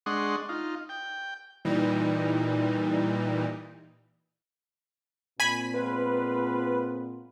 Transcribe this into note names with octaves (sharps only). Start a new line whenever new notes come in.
G#3 D4 D#5 F#5 C6 C#6
D#4 F4
G5
A#2 E3 G3 D#4
A#2 C4 G#5 B5
G#3 B3 F4 B4